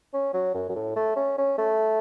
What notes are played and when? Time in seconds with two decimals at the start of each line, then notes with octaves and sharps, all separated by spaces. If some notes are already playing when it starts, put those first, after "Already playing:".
0.14 C#4
0.34 F#3
0.54 F#2
0.69 F#2
0.75 A2
0.96 A3
1.16 C#4
1.38 C#4
1.58 A3